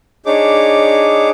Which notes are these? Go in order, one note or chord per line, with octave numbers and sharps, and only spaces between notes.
D4 D#4 G#4 C#5 D6